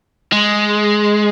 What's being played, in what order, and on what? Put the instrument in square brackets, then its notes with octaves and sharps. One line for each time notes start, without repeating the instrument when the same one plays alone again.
[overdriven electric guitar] G#3